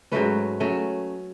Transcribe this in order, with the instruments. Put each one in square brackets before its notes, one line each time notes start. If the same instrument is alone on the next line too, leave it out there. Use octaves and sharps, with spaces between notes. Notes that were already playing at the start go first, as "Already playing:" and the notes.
[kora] G#2 F#3 A3 C#4 B4
F#3 A3 C#4